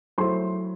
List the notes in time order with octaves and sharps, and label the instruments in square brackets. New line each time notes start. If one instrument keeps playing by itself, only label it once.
[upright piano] F#3 A3 E4 C5 C6